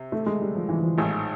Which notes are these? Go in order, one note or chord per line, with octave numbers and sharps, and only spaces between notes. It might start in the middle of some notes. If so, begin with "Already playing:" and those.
Already playing: C3
A3
G#3
G3
F3
E3
E3
F3
A1 G#2 D#3